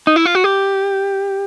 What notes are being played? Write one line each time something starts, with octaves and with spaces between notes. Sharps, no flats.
D#4
E4
F4
F#4
G4